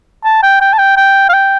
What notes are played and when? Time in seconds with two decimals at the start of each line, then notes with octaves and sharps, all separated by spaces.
0.24 A5
0.43 G5
0.61 G5
0.73 A5
0.79 G5
0.97 G5
1.29 F5
1.33 G5